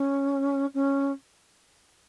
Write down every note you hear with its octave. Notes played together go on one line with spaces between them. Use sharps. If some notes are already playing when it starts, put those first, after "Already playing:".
Already playing: C#4
C#4